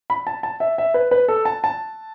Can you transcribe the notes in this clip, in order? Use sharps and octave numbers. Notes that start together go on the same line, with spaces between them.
B5
A5
A5
E5
E5
B4
B4
A4
A5
A5